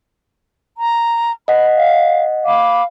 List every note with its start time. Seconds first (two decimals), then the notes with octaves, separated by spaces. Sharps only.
0.77 A#5
1.48 D#5 F#5 B5
1.75 F5
2.45 F5 B5 D6